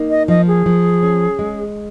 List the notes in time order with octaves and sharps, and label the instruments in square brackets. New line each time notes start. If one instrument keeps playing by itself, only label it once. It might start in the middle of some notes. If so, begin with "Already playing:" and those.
Already playing: [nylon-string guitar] A#3 D#4
[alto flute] D#5
[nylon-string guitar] F3 [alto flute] D#5
[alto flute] G#4
[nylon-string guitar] F3
C#4
G#3